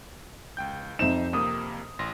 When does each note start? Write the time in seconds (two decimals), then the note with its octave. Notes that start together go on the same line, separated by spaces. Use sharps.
0.57 C#2 G5 G6
0.99 F2 D#4 C5 E5 E7
1.33 F2 C3 A#3 D#6
1.99 A1 C6 A#6